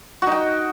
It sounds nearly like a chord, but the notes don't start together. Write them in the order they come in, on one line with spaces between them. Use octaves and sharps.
F#4 D#4 G5